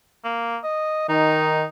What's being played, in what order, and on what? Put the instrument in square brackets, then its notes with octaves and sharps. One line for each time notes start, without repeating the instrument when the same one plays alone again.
[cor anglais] A#3
D#5
[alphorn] D#3 [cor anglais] D#4